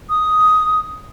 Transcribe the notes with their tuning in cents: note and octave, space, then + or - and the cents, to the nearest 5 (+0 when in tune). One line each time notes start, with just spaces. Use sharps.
D#6 +5